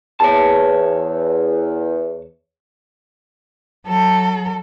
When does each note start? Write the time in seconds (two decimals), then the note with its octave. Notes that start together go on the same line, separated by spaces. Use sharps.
0.20 E2 C#5 A5
3.87 F#3 A4